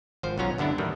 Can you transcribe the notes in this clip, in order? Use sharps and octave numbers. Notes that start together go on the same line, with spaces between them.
G#1 F3 C5
B1 F#3 B3 C#4 F4 A#5
G2 D3 B3 D4 E4
F#2 A2 D#3 E3 G3